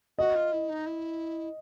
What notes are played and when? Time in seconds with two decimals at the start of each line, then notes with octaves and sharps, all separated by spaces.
0.18 F#4 D#5
0.35 F4
0.52 E4
0.69 D#4
0.86 E4